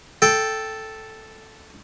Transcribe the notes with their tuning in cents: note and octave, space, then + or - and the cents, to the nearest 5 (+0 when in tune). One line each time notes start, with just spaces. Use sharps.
A4 +0 G5 +0